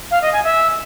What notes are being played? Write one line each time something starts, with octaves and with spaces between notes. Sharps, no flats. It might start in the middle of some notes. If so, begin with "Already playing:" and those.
F5
D#5
G#5
E5